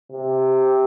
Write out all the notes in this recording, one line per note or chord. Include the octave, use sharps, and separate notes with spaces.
C3